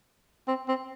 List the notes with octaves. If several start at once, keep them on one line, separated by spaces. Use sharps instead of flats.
C4
C4